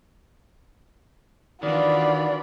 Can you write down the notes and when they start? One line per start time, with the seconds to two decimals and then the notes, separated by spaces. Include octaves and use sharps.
1.63 D#3 E3 D4 F4 F#4 D5 B5